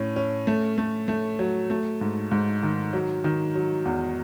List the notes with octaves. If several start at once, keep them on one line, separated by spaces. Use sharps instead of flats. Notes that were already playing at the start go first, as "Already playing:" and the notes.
Already playing: A2 C#4
C#4
A3
A3
A3
F#3
A3
G#2
G#2
D#3
F#3
D#3
F#3
E2